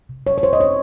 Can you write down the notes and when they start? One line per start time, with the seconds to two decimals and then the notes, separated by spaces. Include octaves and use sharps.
0.09 C3
0.27 F#3 C#5
0.38 C#5
0.43 F4 C5
0.53 D#5
0.59 C4 C#5